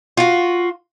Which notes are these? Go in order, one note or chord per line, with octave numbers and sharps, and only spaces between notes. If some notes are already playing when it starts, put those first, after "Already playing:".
F4 F#4